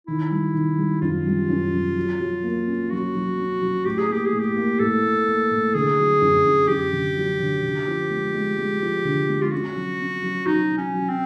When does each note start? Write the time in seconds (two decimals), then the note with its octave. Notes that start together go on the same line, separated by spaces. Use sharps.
0.07 D#3 E4
0.31 G3
0.54 D#3
0.78 G3
1.01 F#2 F4
1.26 G3
1.50 F#2
1.73 F#2
1.96 F#3
2.20 F#3
2.43 A#3
2.67 C#4
2.91 F#3 F#4
3.15 F#3
3.38 C#4
3.61 F#3
3.85 A2 G4
3.99 G#4
4.09 A#3 G4
4.26 G#4
4.33 A2
4.40 G4
4.56 A#3
4.80 A2 A4
5.03 A#3
5.28 A#3
5.51 A2
5.74 D3 G#4
5.98 F#3
6.22 F#2
6.45 F#2
6.68 F#2 G4
6.93 D3
7.16 F#3
7.40 D3
7.63 D3
7.87 F3
8.10 G#3
8.34 G#3
8.58 G#3
8.81 F3
9.05 D3
9.29 G#3
9.42 F4
9.52 C#4 F#4
9.76 F#3
10.00 C#4
10.23 F#3
10.46 F#3 D#4
10.70 F#3
10.78 C#4
10.94 F#3
11.09 C4